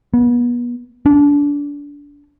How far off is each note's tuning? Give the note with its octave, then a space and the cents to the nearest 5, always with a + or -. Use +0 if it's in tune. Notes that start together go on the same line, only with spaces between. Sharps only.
B3 -35
D4 -25